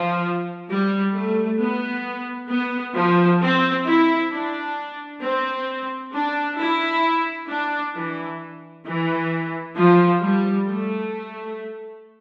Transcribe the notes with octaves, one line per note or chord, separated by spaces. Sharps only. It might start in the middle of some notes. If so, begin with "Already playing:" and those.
Already playing: F3
G3
A3
B3
B3
F3
C4
E4
D4
C4
D4
E4
D4
E3
E3
F3
G3
A3